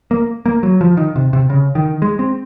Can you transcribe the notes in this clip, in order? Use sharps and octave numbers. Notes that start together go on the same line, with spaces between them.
A#3
A#3
F#3
F3
D#3
C3
C3
C#3
D#3
G#3
C4